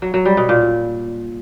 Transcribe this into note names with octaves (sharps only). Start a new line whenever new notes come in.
F#3
F#3
G3
B2
A#2